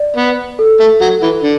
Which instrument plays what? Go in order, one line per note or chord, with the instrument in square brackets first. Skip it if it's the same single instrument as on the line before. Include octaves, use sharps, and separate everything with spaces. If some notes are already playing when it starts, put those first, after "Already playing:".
Already playing: [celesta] D5
[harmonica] B3
[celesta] A4
[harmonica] A3
F#3
E3
D3